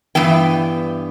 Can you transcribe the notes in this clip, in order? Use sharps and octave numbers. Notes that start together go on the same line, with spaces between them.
G2 E3 B3 G5